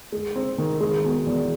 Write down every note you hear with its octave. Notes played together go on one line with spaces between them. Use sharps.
G#3
C4
D#3
G#3
B2
E2